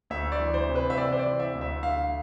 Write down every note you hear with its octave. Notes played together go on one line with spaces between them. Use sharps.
D2 E5
D5
E3
C5
C3
B4
E5
C3 D5
C5
D5
E3
E5
D2
E5
D3 F5